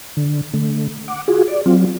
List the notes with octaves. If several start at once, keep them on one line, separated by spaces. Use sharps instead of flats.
D3
D3 A3
F#5 D6
F4 F#4 G#4
D5
F#3 C4 F4